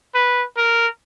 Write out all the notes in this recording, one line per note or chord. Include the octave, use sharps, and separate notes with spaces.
B4
A#4